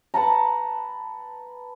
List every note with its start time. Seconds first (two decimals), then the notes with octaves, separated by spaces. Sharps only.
0.14 B4 F#5 A5 A#5